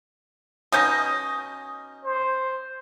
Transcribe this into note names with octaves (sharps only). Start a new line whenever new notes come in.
B2 C#4 D#4 D#6 G6 A#6
C5